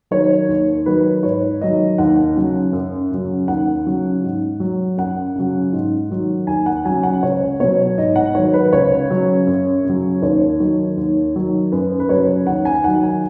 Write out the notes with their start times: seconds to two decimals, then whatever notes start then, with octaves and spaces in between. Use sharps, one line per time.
0.11 D#3 F#3 C#5
0.49 D#2
0.86 D#3 F#3 B4
1.23 G#2 C#5
1.61 D#3 F#3 D#5
1.98 D#2 F#5
2.36 C#3 F#3
2.73 F#2
3.11 C#3 F#3
3.48 D#2 F#5
3.86 C#3 F#3
4.23 G#2
4.60 F#3
4.98 F#2 F#5
5.36 C#3 F#3
5.73 G#2
6.10 D#3 F#3
6.47 D#2 G#5
6.66 F#5
6.85 C#3 F#3 G#5
7.03 F#5
7.23 C#2 C#5
7.60 B2 F#3 C#5
7.98 G#2 D#5
8.16 F#5
8.35 D#3 F#3 C#5
8.54 B4
8.73 C#2 C#5
9.10 C#3 F#3
9.47 F#2
9.85 C#3 F#3
10.22 D#2 C#5
10.60 D#3 F#3
10.97 D#2
11.35 D#3 F#3
11.72 F#2 B4
12.00 B4
12.09 C#3 F#3 C#5
12.46 D#2 F#5
12.65 G#5
12.84 D#3 F#3 F#5
13.03 G#5